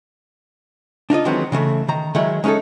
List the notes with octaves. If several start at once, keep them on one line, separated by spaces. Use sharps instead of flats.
D4 D#4 F4 D#5
D#3 E3 F#3 G#3 B3 C4
C#3 E3 G#3 A3
D#3 A#5
D#3 F#3 G#3 E4
G#3 C#4 D#4 G#4 A4